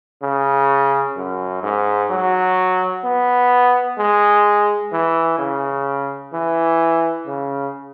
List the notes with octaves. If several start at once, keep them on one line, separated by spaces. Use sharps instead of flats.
C#3
F#2
G#2
F#3
B3
G#3
E3
C#3
E3
C#3